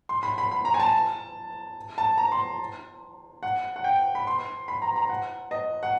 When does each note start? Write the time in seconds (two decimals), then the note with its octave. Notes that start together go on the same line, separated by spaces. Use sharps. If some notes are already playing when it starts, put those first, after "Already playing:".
0.09 C6
0.23 B5
0.38 B5
0.51 B5
0.65 A#5
0.74 G#5
0.80 A5
1.98 A5
2.18 A#5
2.32 C6
3.43 F#5
3.76 F#5
3.84 G5
4.15 B5
4.27 C6
4.68 B5
4.82 A#5
4.96 A#5
5.09 F#5
5.51 D#5
5.83 F#5